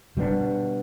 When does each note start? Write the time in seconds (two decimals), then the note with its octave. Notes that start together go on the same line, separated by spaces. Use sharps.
0.17 B2 G3 B3 D4